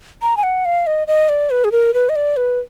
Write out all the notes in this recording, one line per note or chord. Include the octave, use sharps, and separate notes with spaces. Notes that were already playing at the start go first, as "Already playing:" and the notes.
A#5
G#5
F#5
F5
D#5
D#5
D5
B4
G#4
A#4
B4
D#5
D5
B4